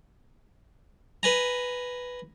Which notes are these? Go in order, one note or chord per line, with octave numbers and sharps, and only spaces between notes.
B4 G#5 A#5